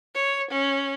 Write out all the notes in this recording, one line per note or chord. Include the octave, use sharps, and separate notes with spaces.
C#5
C#4